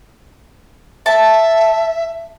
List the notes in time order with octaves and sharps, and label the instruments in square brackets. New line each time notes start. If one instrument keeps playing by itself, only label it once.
[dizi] E5 [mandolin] A5